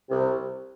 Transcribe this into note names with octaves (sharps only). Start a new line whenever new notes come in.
C2 C3